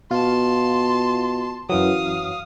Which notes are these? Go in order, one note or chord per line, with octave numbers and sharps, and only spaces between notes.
B2 F4 A5 C6
F#2 E3 F#3 F5 D#6